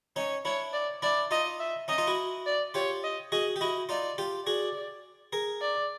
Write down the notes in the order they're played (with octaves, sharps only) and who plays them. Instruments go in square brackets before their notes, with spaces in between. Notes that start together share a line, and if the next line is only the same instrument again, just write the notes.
[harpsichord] C#4 D#4 [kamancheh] C#5
[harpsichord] D4 E4 [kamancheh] C#5
[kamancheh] D5
[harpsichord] D4 E4 [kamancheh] D5
[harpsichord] D#4 F4 [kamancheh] D#5
[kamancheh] E5
[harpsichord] C#4 D#4 [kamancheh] D#5
[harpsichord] D#4 F4
E4 F#4
[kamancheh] D5
[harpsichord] F4 G4 [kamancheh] C#5
[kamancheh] D#5
[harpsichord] F#4 G#4 [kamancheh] D#5
[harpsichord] G4
[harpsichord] E4 F#4 [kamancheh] D#5
[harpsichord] D#4 F4 [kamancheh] D5
[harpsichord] F4 G4
[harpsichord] F#4 G#4 [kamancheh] D5
[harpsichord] G#4 A#4
[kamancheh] D5